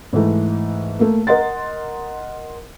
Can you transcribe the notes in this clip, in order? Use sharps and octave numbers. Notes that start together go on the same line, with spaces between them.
G#2 E3 A3
A3 A#3
A#4 D#5 F#5 C6 A6